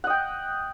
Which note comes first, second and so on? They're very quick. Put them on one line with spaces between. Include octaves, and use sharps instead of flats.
F#5 D#5 G5